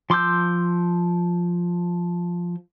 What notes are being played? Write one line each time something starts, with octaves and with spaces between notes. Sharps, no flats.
F3 C6 D6 E6 G6